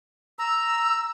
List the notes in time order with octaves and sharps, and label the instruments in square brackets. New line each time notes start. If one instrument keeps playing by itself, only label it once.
[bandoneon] A#5 [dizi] E6